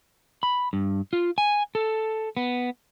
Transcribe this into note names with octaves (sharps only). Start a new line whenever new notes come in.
B5
G2
F4
G#5
A4
B3